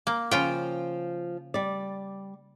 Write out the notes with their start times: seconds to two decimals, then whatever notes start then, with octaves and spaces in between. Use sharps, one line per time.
0.07 A#3
0.31 C#3 F3 F4 G5
1.54 G3 D5